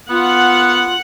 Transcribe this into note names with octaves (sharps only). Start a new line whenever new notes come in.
B3 F4 F#5